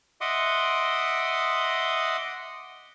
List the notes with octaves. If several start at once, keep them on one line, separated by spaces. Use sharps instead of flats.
D#5 E5 F#5 C6 D6 D#6